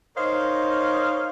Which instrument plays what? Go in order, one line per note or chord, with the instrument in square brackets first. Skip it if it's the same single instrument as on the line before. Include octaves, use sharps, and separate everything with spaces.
[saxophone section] D#4 A#4 C5 C#5 D#5 F5